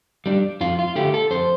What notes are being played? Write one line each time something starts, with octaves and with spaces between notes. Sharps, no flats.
G3 D4
F2 F4
F4
D3 A3 G4
A4
F2 C5